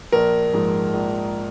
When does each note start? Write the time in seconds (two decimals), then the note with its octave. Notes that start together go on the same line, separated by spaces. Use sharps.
0.12 A#1 A#4
0.54 G#2 F3
0.94 A#1